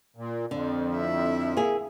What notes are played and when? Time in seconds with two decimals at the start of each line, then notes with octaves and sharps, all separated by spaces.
0.16 A#2
0.51 F2 D3
0.96 E4 E5
1.57 A#3 G#4